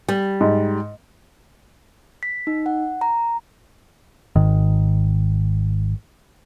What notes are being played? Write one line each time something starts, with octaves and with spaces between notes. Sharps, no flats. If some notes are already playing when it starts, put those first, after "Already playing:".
G3
G#2
B6
D#4
F#5
A#5
G#1 G#2 D#3